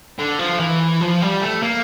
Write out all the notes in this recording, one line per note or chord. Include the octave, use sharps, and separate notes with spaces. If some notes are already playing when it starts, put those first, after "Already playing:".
D3
F3
E3
F3
G3
A3
A#3